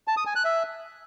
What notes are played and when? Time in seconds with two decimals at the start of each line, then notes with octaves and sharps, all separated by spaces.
0.08 A5
0.17 D#6
0.26 G#5
0.35 F#6
0.45 E5